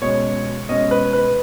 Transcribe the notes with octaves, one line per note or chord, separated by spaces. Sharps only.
B2 G#3 C#4 C#5
B2 G#3 C#4 D#5
B4
B4